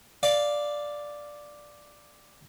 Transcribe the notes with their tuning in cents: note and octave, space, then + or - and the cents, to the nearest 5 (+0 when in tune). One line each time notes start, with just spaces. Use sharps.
D5 +0 F5 +0